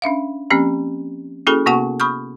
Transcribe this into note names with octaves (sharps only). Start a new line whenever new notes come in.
C#4 D4 E5 F5
F3 A#3 C4 C#4 G4
A#3 C#4 E4 F#4 G#4 A4
C3 A#3 B3 F#4 F#5 C#6
B5 C#6 D#6 F6 G6